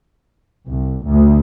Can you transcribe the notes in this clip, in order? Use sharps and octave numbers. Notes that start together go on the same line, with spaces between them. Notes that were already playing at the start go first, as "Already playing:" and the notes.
C2
D2